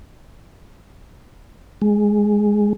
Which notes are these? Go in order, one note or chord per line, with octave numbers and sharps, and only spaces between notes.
G#3